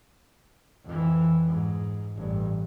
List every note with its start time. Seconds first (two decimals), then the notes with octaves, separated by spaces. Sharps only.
0.85 F2 E3
1.47 G#2
2.17 A1 G2